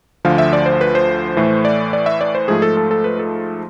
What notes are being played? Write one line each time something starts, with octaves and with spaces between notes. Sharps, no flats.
D2 D3 F3 F5
E5
D5
C5
B4
C5
A2 E3 A3
D5
D5
E5
D5
C5
G#2 F3 A3 G#4
A4
A4
A4
B4
A4